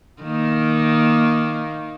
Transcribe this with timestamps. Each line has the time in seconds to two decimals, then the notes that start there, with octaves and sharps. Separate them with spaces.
0.22 D#3 A#3